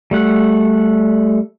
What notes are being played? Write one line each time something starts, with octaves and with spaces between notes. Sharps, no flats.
G3 A3 F#5